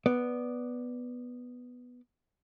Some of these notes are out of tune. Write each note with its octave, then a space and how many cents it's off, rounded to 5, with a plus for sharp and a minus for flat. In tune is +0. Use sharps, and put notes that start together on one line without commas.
B3 +0 D5 +0